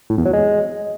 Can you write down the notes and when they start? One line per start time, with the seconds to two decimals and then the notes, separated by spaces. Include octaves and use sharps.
0.10 A2
0.18 E2
0.26 F#3
0.33 G#3